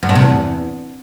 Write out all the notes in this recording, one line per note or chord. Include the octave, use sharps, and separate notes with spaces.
F#2
G2
C3
E2